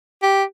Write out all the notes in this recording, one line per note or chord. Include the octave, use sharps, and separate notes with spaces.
G4